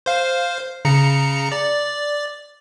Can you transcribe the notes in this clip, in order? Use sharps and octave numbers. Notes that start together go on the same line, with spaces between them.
C5 F5
C#3 A#5 C#7
D5